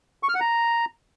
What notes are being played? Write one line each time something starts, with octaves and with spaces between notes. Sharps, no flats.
C#6
F6
F#5
A#5